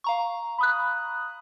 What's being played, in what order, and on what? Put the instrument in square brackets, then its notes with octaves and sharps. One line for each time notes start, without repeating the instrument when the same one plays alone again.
[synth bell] F5 A#5 C#6
[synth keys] B5 D#6 F#6